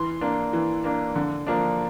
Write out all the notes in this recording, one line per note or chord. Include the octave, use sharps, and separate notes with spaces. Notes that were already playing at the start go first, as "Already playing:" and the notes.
Already playing: E3 C6
A#3 D4
E3
A#3 D4
D3
F3 A#3 D4